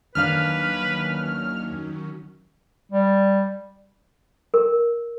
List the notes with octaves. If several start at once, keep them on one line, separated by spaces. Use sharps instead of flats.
D#2 D#3 F#3 C#4 D4 B4 F5 F6
G3
A#4